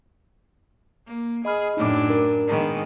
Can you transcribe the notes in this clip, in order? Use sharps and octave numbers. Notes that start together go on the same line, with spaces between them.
A#3
G#4 D#5 B5 F6
F#2 A2 D4 D#4 D6
A#4
G#2 D#3 B3